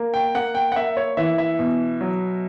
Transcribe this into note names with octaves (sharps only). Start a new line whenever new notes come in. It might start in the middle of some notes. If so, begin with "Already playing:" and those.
Already playing: A#3
G5
A#3 F#5
G5
F#5
A#3 E5
C#5
E3 E5
E5
B2
F#3